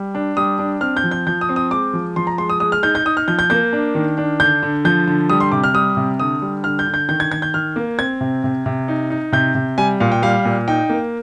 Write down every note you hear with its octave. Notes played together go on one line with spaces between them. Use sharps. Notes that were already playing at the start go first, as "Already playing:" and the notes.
Already playing: G3
D4
G3 D#6
D4
C4 F6
G6
F3
G6
F3 G6
D#6
C4
D#6
G#3 D6
F3
F3 C6
A#5
G#3 C6
D#6
G#3 D#6
F6
D#4 G6
G6
D#4 D#6
F6
F3 G6
G6
A#3 G6
D4
D#3
D4
D3 G6
D3
F3 G6
D3
G3 D#6
C6
C3 D6
F6
G3 D#6
C3
D3 D#6
G3
D3 F6
G6
D3
G6
D#3 G6
G#6
D#3 G#6
G6
D#3 F6
A#3
C4 G#6
C3
C3
C3
D#4
D#4
C3 G6
C3
G3 G#5
A#2 F5
G5
G3 F5
A#2
D#4 G5
A#3